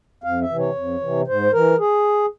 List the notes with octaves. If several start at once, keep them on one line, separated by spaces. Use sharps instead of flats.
F2 F5
E5
C3 E3
C#5
F2
C3 E3
G#2 C5
E3 A#4
G#4